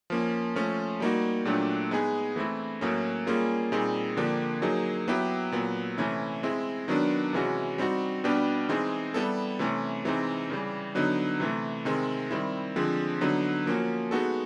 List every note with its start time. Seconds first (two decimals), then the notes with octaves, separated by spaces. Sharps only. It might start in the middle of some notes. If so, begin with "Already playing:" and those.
0.10 F3 A#3 C#4
0.56 F3 A3 C#4
1.00 G3 A#3 D#4 F#4
1.45 A#2 F#3 A3 D4 G4
1.91 G#3 B3 D#4 G#4
2.36 E3 A3 C4 E4
2.81 A2 F#3 A#3 C#4
3.27 G3 A#3 C#4 F4 G#4
3.72 A#2 G3 C4 D#4 G#4
4.17 D3 F3 A#3 D4 G4
4.62 F#3 A#3 D#4 G#4
5.08 F#3 B3 E4 G4
5.52 A#2 F#3 B3
5.98 C3 E3 A3 C#4 E4
6.43 G#3 C4 E4
6.88 D#3 F#3 B3 D4
7.33 C3 E3 G#3 C#4 F#4
7.78 G3 C4 D#4 F#4
8.24 B2 G3 B3 D4 G4
8.69 E3 G#3 C4 D#4 G#4
9.14 G3 B3 E4 A4
9.59 C3 E3 A3 C#4
10.05 C3 E3 G#3 C4 D#4
10.50 C#3 E3 G3
10.95 D3 F#3 B3 D#4
11.40 C3 E3 A3
11.85 C3 D#3 G#3 C4
12.31 D#3 G3 C4 E4
12.76 D3 F3 G#3 C4
13.21 D3 F#3 B3 D#4
13.66 F3 A#3 C#4 F#4
14.11 G#3 B3 D#4 F#4 A4